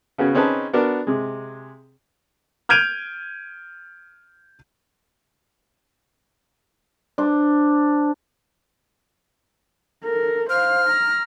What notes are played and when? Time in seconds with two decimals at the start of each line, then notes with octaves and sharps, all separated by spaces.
0.18 C#3 B3 C#4 F#4
0.35 C4 C#4 D#4 G#4 B4 A5
0.73 B3 D4 F#4 A#4
1.07 C3 G#3
2.69 F6 G6 G#6 D7 D#7 F7
7.18 D4 C5
10.03 A4 A#4
10.49 C5 F5 F6
10.88 A#5